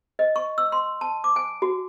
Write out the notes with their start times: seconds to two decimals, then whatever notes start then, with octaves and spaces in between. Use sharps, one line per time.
0.19 D#5
0.36 C#6
0.58 E6
0.72 C6
1.01 A5
1.24 D6
1.36 G#5
1.62 F#4